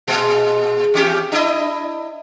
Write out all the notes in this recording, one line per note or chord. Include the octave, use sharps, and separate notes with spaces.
A#2 G#3
E2 C#4 G4
D4 E4 D#5